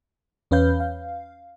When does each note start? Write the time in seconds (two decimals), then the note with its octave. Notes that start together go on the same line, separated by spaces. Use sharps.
0.51 E2 C#4 B4 F5 G6
0.80 F5